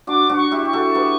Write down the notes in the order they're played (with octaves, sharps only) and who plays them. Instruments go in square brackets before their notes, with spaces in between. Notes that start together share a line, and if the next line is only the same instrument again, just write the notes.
[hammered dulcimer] D4 F#4 [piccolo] D6
[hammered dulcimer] D4 F#4
[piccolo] C#6
[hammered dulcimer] E4 G4
[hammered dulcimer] G4 [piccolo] C#6
[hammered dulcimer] F#4 A4
G4 B4